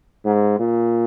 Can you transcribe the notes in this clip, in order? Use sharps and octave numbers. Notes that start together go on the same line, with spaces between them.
G#2
A#2